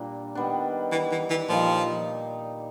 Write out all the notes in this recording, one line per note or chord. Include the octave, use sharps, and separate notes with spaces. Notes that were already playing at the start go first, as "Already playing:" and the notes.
Already playing: A#2 G3 A#3 D4
D#3 G3 B3 D4
E3
E3
E3
A#2 F3 G3 A#3 D#4